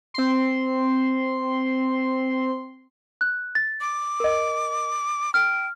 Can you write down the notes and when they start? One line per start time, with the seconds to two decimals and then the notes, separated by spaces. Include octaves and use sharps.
0.14 C4 C6
3.21 F#6
3.55 A6
3.81 D6
4.20 A#4 D#5
5.34 G5 F6